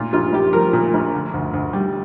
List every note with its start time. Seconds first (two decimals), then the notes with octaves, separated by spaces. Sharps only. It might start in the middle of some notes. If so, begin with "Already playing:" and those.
Already playing: A#2 F4
0.13 A#1 F4
0.33 A#1 G4
0.53 F3 A#4
0.73 A#2
0.94 A#1
1.14 D3
1.34 D2
1.54 D2
1.73 G3